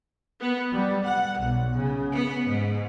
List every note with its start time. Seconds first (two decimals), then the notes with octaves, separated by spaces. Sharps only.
0.40 B3
0.71 G3
1.05 F#5
1.39 B1
1.74 C#3
2.12 B3
2.48 G#2